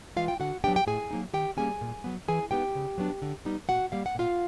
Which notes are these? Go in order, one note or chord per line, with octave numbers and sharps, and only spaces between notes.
E3 G#3 F4 F5
G5
D3 F#4 F#5
F#3 B3 D4 G4 G5
G5
A2 G#4 G#5
F#3 A#3 D#4
D#3 G4 G5
G3 A#3 C#4 G#4 G#5
A#2
F#3 B3
E3 G#4 G#5
G#3 B3 D#4 G4 G5
C#3
F#3 B3 D4
D3
G3 B3 D#4
A#2 F#4 F#5
G3 A#3 F5
F#5
A#2 F4 F5